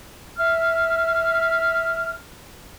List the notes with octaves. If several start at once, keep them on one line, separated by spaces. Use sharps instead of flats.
E5 F6